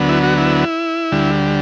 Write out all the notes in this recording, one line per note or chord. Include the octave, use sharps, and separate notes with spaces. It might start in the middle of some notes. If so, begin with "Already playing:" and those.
Already playing: D2 D3 F#3 B3
E4
F#4
E4
D2 D3 G3